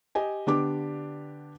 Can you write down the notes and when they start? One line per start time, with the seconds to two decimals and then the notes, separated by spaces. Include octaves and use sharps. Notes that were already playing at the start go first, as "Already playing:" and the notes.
0.15 G4 D#5 G#5
0.47 D3 B3 D4 G4 D6